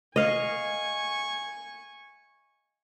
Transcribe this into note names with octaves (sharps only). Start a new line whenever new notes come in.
D#5 F5 G#5 C#6